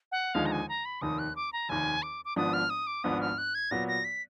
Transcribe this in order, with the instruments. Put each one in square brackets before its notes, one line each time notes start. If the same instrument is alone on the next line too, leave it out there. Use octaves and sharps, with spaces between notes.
[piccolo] F#5
[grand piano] D#2 D3 F3 G#3 D#4 [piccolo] F5
[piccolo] A#5
G#5
A#5
B5
[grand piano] F1 D#2 D#3 [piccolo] D#6
[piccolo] F#6
D6
A#5
[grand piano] F1 D#2 D#3 [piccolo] G#5
[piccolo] D6
D6
[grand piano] G#1 G#2 F3 B3 D4 [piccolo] D#6
[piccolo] F6
D#6
D6
[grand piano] G#1 G#2 F3 B3 D4 [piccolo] D#6
[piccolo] F6
F#6
G#6
[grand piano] A#2 F#3 B3 [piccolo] A#6
[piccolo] A#6
B6